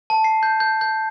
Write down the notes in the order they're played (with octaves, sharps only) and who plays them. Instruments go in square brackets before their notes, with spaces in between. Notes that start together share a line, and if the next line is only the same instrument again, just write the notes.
[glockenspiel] A5
C7
G6
G6
G6